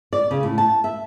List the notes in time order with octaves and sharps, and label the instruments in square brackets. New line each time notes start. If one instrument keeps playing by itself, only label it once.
[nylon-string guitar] D5
C#3
A2
A5
E5